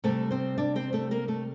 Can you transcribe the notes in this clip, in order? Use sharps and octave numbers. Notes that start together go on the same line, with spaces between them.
C3 G3 A3 A4
C4 C5
D4 D5
C4 C5
A3 A4
A#3 A#4
A3 A4